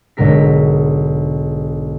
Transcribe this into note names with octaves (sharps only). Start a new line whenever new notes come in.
B1 G#2 D3 G#3 A#4 B6